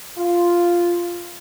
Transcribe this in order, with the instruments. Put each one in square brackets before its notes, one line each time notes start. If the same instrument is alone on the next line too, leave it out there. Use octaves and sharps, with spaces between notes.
[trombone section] F4